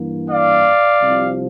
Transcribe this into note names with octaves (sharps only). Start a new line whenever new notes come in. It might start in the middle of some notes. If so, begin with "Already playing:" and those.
Already playing: G2 E3 A#3
D5 F5
C2 C3 F3